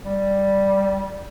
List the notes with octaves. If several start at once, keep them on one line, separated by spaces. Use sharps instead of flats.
G3